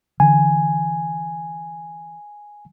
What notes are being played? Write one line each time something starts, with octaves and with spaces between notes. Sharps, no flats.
D3 E3 G#5